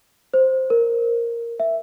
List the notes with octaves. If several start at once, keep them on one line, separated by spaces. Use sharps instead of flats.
C5
A#4
E5